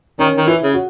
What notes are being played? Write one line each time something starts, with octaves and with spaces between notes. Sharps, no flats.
D#3 C#4
D#3
E3 E4
C#3
F#4